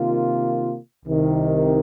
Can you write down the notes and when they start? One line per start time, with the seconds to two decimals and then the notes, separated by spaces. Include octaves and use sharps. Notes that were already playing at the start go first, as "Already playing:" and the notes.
Already playing: C3 D#3 A#3 F4
1.05 C2 C3 D#3